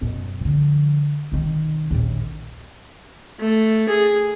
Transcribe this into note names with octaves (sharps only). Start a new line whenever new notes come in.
F#2 B2
D3 F3
B1 D#3
A#1 D#2
A3
G#4